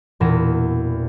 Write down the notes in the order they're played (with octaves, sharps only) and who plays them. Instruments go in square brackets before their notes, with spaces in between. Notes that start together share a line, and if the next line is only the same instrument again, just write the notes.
[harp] E1 E2 A#2 A#6 E7